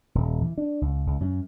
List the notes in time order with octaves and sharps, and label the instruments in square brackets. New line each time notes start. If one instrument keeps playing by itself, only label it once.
[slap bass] D#1
E3
D4
C#2
C#2
F#2